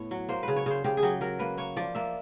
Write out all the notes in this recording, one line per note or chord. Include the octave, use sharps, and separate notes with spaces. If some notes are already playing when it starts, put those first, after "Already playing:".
Already playing: A2 B3 C#5
F#3
A#3 C5
C#3 B4
C#5
C#3 C5
C#3 G4
G#4
F#3 G4
F#3 A#4
A#3 B4
A#3 C#5
F3 D5
A#3 E5